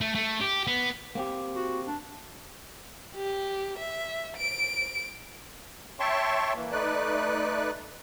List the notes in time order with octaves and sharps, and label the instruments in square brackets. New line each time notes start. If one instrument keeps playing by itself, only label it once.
[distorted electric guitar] A3
A3
G4
B3
[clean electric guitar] A#3 C4 G4
[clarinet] F#4
D4
[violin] G4
E5
D7
[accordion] C#5 E5 G5 A5 C6 C#6
E3 A#3
A3 D#4 B4 D5 F#6